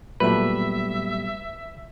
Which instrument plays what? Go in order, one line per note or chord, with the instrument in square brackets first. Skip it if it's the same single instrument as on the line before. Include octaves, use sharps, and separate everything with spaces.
[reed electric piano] A#2 F#3 A3 [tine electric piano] G3 B3 G4 [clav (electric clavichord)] B4 [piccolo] E5